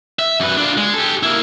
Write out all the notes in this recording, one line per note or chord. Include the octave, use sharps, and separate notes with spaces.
E5
F#2 B4
D4 F4
G#3
G4 A4
A#3 E4